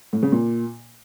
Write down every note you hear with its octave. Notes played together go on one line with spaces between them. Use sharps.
A2
C#3
A#2